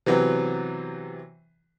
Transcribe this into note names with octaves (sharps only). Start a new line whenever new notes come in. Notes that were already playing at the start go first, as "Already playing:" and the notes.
C3 E3 F#3 B3 C4